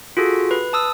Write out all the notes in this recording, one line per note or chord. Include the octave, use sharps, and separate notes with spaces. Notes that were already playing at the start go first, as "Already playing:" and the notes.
F4 F#4 G#4 A4
B4
A5 D#6 E6